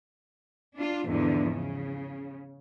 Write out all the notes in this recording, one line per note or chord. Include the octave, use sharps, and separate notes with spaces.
D4 F4
E2 G#2 D3 F3
C#3